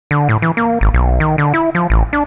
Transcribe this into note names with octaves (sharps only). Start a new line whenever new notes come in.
D3
A2
E3
A#3
G#1
B1
D#3
D3
E4
F3
A1
D4